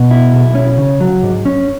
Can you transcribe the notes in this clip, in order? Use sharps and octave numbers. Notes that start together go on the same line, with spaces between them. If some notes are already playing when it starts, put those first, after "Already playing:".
Already playing: B2
E4
B1
C#4
C#3
F#3
G#2
C#4